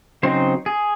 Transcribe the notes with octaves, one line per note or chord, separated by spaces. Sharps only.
C#3 F#3 C4 D#4 C5
G#4